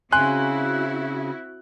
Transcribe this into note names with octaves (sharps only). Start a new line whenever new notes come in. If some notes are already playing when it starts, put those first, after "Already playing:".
C#3 C4 E4 F#4 G#5 C6 F#6